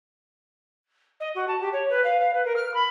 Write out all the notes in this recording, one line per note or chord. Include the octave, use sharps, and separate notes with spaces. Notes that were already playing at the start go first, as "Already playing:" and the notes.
D#5
F#4
A5
G4
C#5
B4
F5
F5
B4
A#4
F6
B5